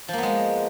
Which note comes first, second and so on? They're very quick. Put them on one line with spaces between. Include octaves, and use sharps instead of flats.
F3 A#3 B3 G#3